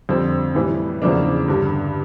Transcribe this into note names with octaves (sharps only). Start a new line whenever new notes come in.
F2 D3 G3 C4
A2 E3 G3
E2 C#3 F3 A#3 D4
G2 D3 G3